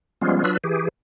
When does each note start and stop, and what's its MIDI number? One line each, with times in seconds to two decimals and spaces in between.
0.21 0.43 53
0.21 0.43 55
0.21 0.43 56
0.21 0.43 59
0.21 0.43 61
0.21 0.43 65
0.44 0.57 54
0.44 0.57 62
0.44 0.57 65
0.44 0.57 71
0.44 0.57 88
0.64 0.88 52
0.64 0.88 67
0.64 0.88 68